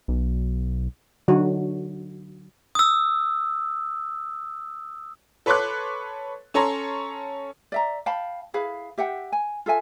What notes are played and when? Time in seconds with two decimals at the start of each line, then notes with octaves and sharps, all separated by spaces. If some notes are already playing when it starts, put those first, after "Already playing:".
0.08 B1
1.28 D3 F#3 D#4 F#4
2.75 D#6 E6
5.46 A4 B4 C#5 C6 D6 F#6
6.54 C#4 A4 C#5 A#5 C6
7.72 D5 E5 A#5
8.06 F5 G5 A5 B5
8.54 E4 G#4 B4 F5
8.98 G4 E5 F#5 G5
9.32 G#5
9.66 F4 A4 E5 G#5